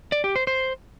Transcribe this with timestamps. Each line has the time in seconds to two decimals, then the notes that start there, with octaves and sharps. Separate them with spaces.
0.12 D5
0.24 G4
0.36 C5
0.47 C5